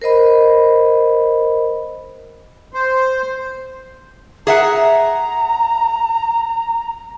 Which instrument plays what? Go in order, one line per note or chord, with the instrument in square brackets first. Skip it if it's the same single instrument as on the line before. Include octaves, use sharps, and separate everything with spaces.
[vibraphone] A#4 C5 D#5 B5
[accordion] C5
[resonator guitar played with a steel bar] G#4 E5 F#5 [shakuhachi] A#5